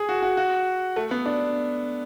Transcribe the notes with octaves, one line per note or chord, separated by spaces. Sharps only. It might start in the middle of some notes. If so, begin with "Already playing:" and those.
Already playing: G#4
F#4
F#4
F#4
A3
B3
D4